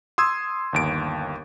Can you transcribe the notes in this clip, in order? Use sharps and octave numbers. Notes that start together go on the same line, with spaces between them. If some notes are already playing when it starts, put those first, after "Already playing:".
C6 D#6 E6 G#6
G1 D#2 D7